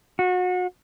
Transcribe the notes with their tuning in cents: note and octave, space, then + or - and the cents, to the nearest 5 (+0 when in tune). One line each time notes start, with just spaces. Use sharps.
F#4 -30